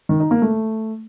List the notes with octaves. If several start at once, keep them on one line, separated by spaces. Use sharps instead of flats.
D#3
D#4
A#3
A3